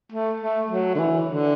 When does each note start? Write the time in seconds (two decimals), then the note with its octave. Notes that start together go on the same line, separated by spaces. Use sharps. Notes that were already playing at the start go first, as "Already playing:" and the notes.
0.12 A3
0.40 A3
0.70 F#3
0.95 D3
0.99 E3
1.30 D3